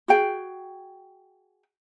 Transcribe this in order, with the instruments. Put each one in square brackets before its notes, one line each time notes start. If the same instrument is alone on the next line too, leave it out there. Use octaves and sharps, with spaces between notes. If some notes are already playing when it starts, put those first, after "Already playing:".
[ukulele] F#4 G#4 G5